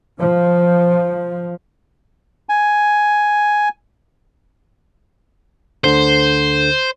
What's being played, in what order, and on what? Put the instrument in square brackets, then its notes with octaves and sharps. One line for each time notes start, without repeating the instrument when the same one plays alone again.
[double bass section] F3
[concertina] G#5
[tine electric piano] D2 D3 A4 [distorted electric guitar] C5